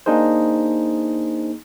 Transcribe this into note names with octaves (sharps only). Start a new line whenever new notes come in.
A#3 D4 D#4 G#4 C5